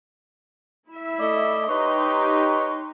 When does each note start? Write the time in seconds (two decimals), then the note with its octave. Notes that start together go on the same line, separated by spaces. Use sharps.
0.90 E4 E5
1.20 A3 D5 D#5
1.69 D#4 G4 B4 C#5 D#5 C6